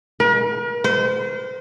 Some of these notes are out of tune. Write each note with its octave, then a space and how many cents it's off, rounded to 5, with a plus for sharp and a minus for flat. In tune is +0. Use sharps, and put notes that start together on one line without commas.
A#4 +45
C5 -35